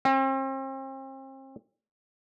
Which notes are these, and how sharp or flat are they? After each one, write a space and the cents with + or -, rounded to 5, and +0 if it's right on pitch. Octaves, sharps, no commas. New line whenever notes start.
C4 +40